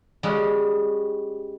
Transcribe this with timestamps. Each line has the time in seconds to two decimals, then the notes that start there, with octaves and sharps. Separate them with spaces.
0.23 G3 G#3 C#4 F#4